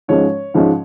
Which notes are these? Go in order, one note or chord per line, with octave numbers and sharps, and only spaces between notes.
G#2 F3 G#3 C#4 C#5
G#2 F3 G#3 C#4